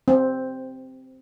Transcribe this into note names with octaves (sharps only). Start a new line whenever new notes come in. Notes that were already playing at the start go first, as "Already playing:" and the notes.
C4